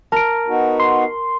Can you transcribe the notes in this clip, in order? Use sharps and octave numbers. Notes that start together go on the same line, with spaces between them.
A#4 A5 D7
B3 D#4 F#4
C6